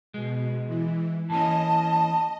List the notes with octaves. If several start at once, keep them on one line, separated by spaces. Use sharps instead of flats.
B2 G#3
E3
E3 A#3 C#4 D#5 A5